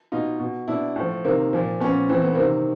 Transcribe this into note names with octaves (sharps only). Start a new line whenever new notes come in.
B2 D#4 F4
B2
B2 D4 E4
A2 F3
C3 D#3 A#3 C4
A#2 F3
A#2 F3 B3 C#4
A2 E3 C4
B3
C3 D#3 A#3 C4